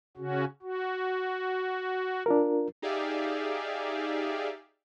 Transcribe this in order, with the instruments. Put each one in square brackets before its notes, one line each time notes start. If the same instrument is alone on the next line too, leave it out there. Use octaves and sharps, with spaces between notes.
[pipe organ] C#3 C#4 F#4
F#4
[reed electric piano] D4 F4 A#4
[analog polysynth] D#4 G4 G#4 D5 E5 F5